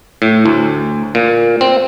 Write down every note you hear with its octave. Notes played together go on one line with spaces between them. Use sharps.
A2
D2
A#2
C4